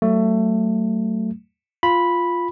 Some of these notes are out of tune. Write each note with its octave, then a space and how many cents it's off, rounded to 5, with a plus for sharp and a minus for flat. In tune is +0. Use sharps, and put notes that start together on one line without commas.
F#3 +35 A3 +20
F4 +0 B5 -5